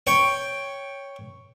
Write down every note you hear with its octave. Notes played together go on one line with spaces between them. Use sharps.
C#5 G5